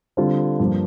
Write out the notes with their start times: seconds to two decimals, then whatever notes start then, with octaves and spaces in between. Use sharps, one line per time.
0.17 D3 G3 C4 F4
0.60 G2 F3 A#3